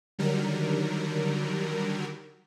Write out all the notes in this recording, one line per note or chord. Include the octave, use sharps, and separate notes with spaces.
D3 D#3 F#3 G3 A#4